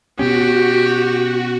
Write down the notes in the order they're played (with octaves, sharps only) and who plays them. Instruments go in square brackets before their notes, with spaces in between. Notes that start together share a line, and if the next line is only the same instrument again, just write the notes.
[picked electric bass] B2 B3 C#4 [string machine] F#4 [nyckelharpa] G4